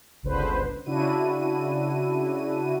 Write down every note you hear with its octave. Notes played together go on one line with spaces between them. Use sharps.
G1 C#2 D3 B4 C5
C#3 D4 E4 F#4 D#7